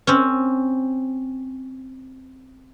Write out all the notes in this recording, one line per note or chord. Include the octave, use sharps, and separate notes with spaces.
C4 C#4